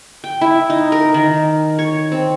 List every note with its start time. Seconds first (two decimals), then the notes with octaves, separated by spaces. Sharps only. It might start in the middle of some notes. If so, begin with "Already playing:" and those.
0.24 G5
0.41 E4
0.70 D#4
0.92 A#4
1.14 D#3
1.79 C#5
2.12 C4